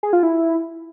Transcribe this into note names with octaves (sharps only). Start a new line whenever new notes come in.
G#4
F4
E4